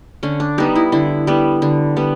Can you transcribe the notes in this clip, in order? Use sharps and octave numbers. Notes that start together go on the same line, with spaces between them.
D3 C#4
D4
G3 B3 D#4
E4
D3 E4
G3 B3
D3
G3 B3